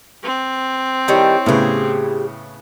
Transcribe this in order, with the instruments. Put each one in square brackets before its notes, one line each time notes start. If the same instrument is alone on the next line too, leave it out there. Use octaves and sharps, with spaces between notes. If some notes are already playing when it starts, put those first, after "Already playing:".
[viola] C4
[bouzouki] D#3 G3 G#4 [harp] E4 C#5 G5
[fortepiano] A2 C#3 B3 [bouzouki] G4 G#4